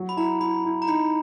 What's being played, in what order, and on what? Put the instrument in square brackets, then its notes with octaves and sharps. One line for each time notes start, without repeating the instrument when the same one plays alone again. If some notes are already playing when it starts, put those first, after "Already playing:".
Already playing: [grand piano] F#3
[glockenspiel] B5
[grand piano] E4 [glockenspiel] A#5
[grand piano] E4 [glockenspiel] B5
[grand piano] E4
[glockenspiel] A#5
[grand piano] D#4 [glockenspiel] B5